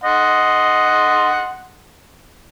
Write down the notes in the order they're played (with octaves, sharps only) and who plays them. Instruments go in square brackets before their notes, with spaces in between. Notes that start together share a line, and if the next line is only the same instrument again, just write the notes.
[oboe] D#5 [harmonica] F#5 C6